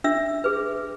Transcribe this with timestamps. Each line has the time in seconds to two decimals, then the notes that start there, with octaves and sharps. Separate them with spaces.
0.04 D4 E5 E6
0.44 G#4 B4